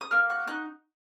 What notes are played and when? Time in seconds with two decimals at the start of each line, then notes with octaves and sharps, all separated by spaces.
0.01 D#6
0.11 A#3 F6
0.30 F#4 F#6
0.47 D#4 F#6